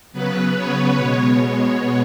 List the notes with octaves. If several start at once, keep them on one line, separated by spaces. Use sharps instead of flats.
C#3 F#3 B3 B4
C#5
B2 G#3 B3
C#5